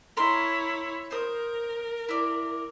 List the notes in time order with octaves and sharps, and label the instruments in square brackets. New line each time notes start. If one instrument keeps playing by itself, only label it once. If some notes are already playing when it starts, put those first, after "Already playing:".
[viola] E4 C#5 [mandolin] A#4 C6
[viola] A#4 [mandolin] C5 D#6
[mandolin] E4 D5